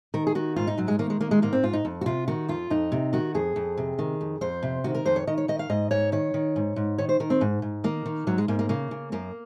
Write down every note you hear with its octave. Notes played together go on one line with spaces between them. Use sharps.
D#3 A#4
G#4
D#3 F#4
G#2 F4
D#4
G#2 F#3
G#3
D#3 A#3
G#3
D#3 A#3
G#3
G#2 A#3
C4
G#2 F4
D#4
F2
F#4
C3 F4
D#3 F#4
F2 F4
F2 D#4
C3
D#3 F#4
F2 G#4
F2
C3
D#3
F2
F2 C5
C3
D#3 F#4
A#4
F2 C5
C#5
D#3 D#5
C#5
D#3 D#5
F5
G#2 D#5
G#2 C#5
D#3 C#5
D#3
G#2
G#2
D#3 C#5
C5
D#3 A#4
C4
G#2
G#2
D#3 A#3
D#3
G#2 F#3
G#3
G#2 A#3
A#3
C#3 A#3
C#3
F#2 A#3